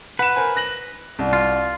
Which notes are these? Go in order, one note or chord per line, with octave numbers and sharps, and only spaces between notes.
B4 F#5 E7
A#4 C5 G#5
F#6 A#6 F#7
C2
F4